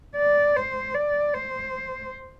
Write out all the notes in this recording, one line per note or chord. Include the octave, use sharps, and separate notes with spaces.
D5
C5
D5
C5